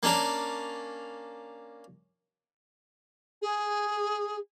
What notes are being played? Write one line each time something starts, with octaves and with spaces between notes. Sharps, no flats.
A#3 C#4 D4 A#4
G#4